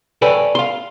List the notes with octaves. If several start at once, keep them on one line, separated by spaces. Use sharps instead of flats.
A4 B4 C#5 D5 G5 G#5
F5 C6